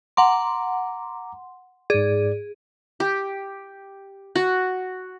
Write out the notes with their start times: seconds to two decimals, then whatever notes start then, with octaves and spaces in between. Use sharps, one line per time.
0.17 F#5 A#5 C6 D6
1.90 G#2 G#4 D5
3.00 G4
4.36 F#4